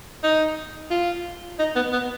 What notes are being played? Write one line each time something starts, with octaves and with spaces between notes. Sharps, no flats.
D#4
F4
D#4
B3
B3